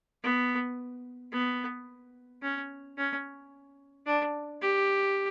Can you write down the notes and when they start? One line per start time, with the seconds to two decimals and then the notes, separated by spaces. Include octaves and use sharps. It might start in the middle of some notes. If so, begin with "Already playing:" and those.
0.23 B3
1.32 B3
2.42 C#4
2.98 C#4
4.06 D4
4.62 G4